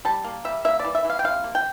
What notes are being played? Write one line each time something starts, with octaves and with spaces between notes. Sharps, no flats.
G3 A5
A#3
G3 E5
A#3 E5
E3 D5
E5
E3 F5
G5
C3 F5
A#3
G5